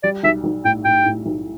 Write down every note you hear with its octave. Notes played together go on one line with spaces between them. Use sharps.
G3 D5
B1 E5
B1
A2 G5
A2 G5
A2
B1